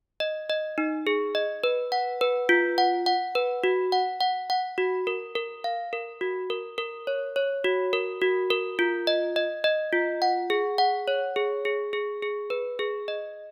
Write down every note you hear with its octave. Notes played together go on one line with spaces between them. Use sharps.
D#5
D#5
D#4
G#4
D#5
B4
F#5
B4
F4
F#5
F#5
B4
F#4
F#5
F#5
F#5
F#4
A#4
A#4
F5
A#4
F#4
A#4
A#4
C#5
C#5
F#4
A#4
F#4
A#4
F4
D#5
D#5
D#5
F4
F#5
G#4
F#5
C#5
G#4
G#4
G#4
G#4
B4
G#4
D#5